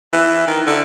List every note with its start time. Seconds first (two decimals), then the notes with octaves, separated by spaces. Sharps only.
0.13 E3
0.47 D#3
0.66 D3